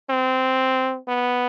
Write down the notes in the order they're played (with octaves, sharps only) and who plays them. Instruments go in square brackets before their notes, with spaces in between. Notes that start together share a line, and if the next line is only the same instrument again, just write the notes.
[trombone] C4
B3